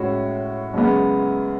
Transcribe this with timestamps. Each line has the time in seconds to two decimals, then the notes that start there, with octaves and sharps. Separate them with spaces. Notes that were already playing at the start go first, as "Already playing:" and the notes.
Already playing: A2 G#3 C#4 F#4
0.74 F#2 C#3 G#3 B3